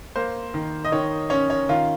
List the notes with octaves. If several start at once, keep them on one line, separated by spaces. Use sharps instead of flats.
A#3 C5
D#3
D#5
D#3 C#5
C#4 C#5
C#5
D#3 F4